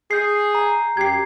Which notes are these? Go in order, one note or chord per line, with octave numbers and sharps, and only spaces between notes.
G#4 G6 C7
A#5
F#2 G4 G#6 C7